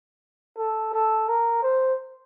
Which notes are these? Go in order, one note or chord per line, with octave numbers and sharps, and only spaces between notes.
A4
A4
A#4
C5